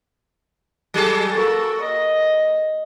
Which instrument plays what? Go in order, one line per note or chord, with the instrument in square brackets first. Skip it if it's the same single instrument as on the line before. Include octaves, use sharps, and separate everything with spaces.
[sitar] F#3 G#4 A4
[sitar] A#3 [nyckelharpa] F#4 A4
[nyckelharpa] D#5